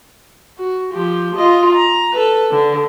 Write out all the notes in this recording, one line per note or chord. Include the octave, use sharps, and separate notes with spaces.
F#4
F3 G4
F4 D#5
A#5
A4 B4
D3